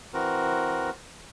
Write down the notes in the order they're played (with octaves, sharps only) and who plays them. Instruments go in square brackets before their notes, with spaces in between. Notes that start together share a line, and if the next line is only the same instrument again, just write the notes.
[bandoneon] E3 C4 F#4 A#4